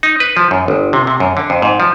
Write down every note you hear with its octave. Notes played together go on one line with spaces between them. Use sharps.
D#4
B4
F3
F#2
G1
C3
C3
F#2
D3
F2
G#2
F3